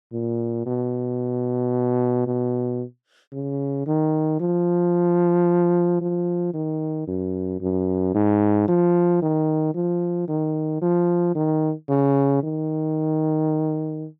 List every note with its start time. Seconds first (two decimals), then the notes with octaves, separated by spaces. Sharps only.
0.12 A#2
0.66 B2
2.26 B2
3.32 C#3
3.87 D#3
4.40 F3
6.01 F3
6.54 D#3
7.08 F#2
7.61 F#2
8.14 G#2
8.68 F3
9.22 D#3
9.75 F3
10.28 D#3
10.82 F3
11.35 D#3
11.89 C#3
12.43 D#3